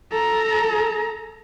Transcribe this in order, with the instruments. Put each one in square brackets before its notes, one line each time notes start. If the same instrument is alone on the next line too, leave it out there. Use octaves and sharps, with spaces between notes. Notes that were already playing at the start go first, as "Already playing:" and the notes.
[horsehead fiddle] A4 A#5